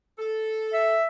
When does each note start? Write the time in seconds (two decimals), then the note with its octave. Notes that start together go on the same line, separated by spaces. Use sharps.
0.19 A4
0.73 E5